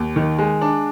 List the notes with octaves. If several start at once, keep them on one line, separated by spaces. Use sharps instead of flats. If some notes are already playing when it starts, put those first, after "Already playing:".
Already playing: D#2
D#3
G#3
D4